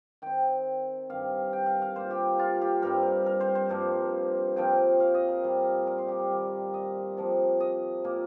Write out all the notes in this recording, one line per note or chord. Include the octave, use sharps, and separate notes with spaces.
D#3 C4 G5
G2 D#3 C4 F5
G5
F5
F5
A#2 A#3 C5
G4
F4
G4
G2 G3 C4 A#4
A#4
C5
C5
G2 F3 A#3
A#2 F3 C4 G5
F5
D#5
A#4
A#2 G3 A#3
A#4
C5
G4
A#4
D#3 G3 A#3
D#5
C3 F3 A#3
D#5
A#2 A#3